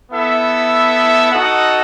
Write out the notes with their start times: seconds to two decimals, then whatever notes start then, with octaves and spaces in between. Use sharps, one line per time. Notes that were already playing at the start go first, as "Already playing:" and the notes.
0.12 B3 E4 A4 E5
1.31 D#4 F#4 A4 D#5 F#5